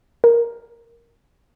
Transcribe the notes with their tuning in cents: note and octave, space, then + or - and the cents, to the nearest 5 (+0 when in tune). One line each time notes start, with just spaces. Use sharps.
A#4 +5